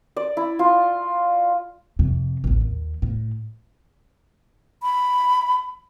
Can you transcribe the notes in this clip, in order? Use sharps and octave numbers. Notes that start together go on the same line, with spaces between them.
D5
E4
F4
F2 C3
A1 D2
D#2
A2
B5